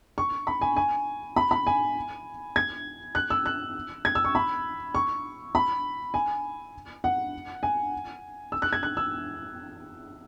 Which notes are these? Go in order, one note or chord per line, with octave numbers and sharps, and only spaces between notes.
C#6
B5
G#5
G#5
B5
B5
G#5
G#6
F#6
E6
F#6
G#6
E6
C#6
B5
C#6
B5
G#5
F#5
G#5
E6
F#6
G#6
F#6
E6